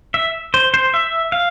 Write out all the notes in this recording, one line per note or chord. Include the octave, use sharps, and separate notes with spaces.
E5
C5
C5
E5
F5